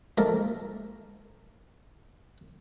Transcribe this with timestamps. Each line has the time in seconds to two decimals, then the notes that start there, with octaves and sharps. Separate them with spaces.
0.17 F3 G#3 A#3 A4 A#4 E5